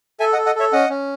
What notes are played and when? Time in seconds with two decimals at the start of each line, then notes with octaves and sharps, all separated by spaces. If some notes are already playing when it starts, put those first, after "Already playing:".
0.20 A4 E5 G#5
0.33 D#5 F#5
0.38 A4
0.46 D#5 F#5
0.55 A4 C#5 E5
0.73 C#4 D#5 F#5
0.90 C#4